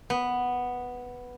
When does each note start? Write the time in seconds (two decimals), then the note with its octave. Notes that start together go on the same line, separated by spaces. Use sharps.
0.10 B3